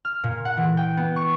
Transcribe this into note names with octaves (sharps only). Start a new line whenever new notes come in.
F6
A#2
F#5
E3
G5
B3
C#6